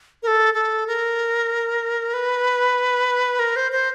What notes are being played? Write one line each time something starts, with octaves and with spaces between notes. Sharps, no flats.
A#4
A4
A4
A#4
B4
A#4
C5
C5